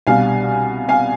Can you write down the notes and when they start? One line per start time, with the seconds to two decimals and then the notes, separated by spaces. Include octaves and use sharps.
0.07 C2 B2 G3 D4 F5 G#5
0.89 F5 G#5